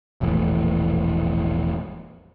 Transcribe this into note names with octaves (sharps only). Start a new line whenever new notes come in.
E1 A#1 A2 E3